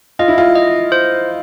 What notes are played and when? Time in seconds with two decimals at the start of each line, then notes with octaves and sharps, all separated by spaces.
0.19 F4 D#5
0.28 E4
0.38 F4
0.56 D#5
0.92 C5